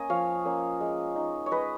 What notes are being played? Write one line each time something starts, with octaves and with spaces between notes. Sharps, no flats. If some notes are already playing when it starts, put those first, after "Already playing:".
Already playing: A#3 C#4 D#5 G#5
F3 C#5 F5
A#3 C#4
G#3
D#4
C#5
G#3 B4 D#5